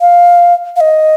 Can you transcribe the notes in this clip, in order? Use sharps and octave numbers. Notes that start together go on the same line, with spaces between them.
F5
F5
D#5